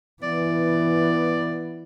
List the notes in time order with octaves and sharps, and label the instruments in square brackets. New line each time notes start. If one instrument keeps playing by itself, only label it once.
[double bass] E3 [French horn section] B3 [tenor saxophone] D5